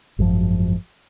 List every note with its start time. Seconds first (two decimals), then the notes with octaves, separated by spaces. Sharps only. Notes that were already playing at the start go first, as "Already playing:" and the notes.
0.19 G#1 F#2 C#3 F3